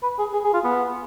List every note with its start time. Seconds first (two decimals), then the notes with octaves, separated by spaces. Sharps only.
0.03 B4
0.19 G#4
0.33 G#4
0.44 G#4
0.54 F4
0.64 B3